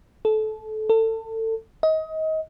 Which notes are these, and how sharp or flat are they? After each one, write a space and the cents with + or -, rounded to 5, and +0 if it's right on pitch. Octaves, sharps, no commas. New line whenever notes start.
A4 -25
A4 +25
D#5 +25